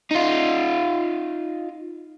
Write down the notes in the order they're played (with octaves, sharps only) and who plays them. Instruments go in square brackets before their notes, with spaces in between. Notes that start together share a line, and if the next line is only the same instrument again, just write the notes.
[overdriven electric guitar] D#4 F4